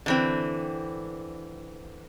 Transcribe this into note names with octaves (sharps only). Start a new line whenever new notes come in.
D3 E3 C4